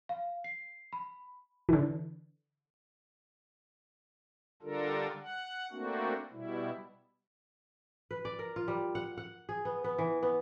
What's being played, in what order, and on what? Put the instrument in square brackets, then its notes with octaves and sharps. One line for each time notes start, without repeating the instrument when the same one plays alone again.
[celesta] F5
C7
B5
[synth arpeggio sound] D3 E3
[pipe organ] D3 G3 D4 F4 A4 A#4
F#5
A3 A#3 C4 D4 F#4
B2 G3 E4
[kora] B4
D5
A#4
F4
G3
F#5
F#5
G#4
B3
B3
E3
B3